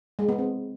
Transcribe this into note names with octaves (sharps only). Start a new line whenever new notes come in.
G#3
B3
C4